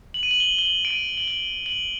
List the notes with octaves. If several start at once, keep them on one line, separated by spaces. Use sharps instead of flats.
F#7
D#7
F#7
G7
G7
F#7
D7
D#7
F#7
G7
F#7